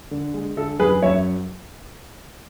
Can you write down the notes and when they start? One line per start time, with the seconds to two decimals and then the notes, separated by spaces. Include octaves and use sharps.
0.11 D3
0.34 G#3
0.57 D3 A4
0.79 F#2 G#4 B4
1.02 F#2 C#5 E5